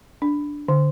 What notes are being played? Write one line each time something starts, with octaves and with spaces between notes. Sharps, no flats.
D4
D3